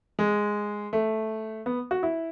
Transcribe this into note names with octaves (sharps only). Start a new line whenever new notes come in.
G#3
A3
B3
F#4
E4